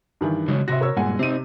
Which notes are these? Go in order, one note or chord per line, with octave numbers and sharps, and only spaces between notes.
G2 D#3 E3
C#3 F#3 G#3
C3 F#4 E5 C6 A#6
A#4 C#5 E6
G2 A#2 G#3 F#5 G#5
C3 C4 D#4 D#7